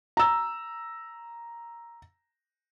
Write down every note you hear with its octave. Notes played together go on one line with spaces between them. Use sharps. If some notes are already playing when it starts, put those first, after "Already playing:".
A#5 E6